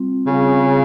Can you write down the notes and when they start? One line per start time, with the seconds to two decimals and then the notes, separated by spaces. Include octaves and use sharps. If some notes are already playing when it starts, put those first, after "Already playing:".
Already playing: G3 C4 F4
0.27 C#3 G3 C4 F4